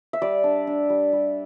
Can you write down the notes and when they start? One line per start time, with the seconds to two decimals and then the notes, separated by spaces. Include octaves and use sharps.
0.13 E5
0.22 G3 D5
0.44 D4
0.67 D4
0.90 G3
1.13 G3